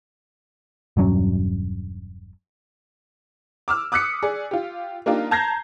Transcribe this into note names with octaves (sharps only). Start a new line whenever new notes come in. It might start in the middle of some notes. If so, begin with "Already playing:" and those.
E1 G2 F#3 C#4
D6 E6 F6
D6 D#6 F#6 B6 C#7
G#4 D5
F4 G4
A#3 D4 D#4 F4 G4
A5 A#5 G6 G#6 A#6 C7